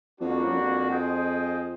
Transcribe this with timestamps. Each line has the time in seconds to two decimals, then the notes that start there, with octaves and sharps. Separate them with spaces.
0.20 F2 G3 A#3 D4 F#4
0.44 F#2
0.55 F2
0.90 F4 G#4 C5 D#5 G5